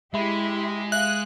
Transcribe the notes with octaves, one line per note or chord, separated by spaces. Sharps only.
G#3 E4 G4 E5 B5
E5 F5 F#6